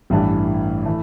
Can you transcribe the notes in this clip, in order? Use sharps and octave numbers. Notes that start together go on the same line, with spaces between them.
A1 G2 E3 A3 D4
E3 A3